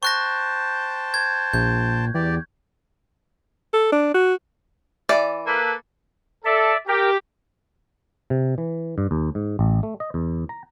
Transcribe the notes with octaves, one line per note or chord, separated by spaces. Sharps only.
C5 G5 A5 C#6 F#6 A#6
G#6
A#1 G6
E2 G4 D5
A4
D4
F#4
E3 D5
A#3 A4 B4
A4 D5 E5
G4 A#4
C3
E3
G2
D#2
G#2
A1
A3
D#5
E2
A#5